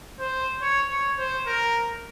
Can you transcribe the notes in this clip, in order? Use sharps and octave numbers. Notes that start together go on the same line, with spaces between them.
C5
C#5
C#5
C5
A#4